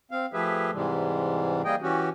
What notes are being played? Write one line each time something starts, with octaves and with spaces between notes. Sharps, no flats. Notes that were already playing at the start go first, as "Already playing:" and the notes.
C4 F5
F3 A3 G4 G#4 B4 E5
G#2 C3 E3 G3 G#3
G3 A#3 G#4 D#5 G5
E3 C#4 F#4 G4